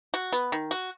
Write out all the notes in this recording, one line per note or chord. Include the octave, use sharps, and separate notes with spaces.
F#4
B3
D#3
F#4